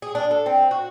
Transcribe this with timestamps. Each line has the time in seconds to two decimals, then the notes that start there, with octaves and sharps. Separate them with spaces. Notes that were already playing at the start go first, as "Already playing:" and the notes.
0.02 G#4
0.15 D4
0.31 A4
0.46 C4
0.71 F#4